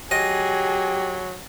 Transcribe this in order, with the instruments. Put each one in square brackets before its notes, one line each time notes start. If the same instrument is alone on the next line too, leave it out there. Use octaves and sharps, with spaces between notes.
[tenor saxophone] F#3 [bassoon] G4 [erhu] G#4 [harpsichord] D#5